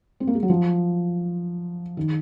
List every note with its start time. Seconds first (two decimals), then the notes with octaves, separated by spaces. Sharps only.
0.20 C4
0.27 A#3
0.35 G#3
0.43 F#3
0.50 F3
1.97 D#3